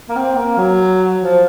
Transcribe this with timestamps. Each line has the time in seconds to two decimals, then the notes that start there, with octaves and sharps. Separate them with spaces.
0.09 A#3
0.16 C4
0.36 A#3
0.57 F#3
1.21 F3